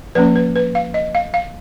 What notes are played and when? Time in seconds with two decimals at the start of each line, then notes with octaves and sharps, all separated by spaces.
0.15 F3 A#3 C#4 B4
0.35 B4
0.56 B4
0.75 F5
0.94 D#5
1.15 F5
1.34 F5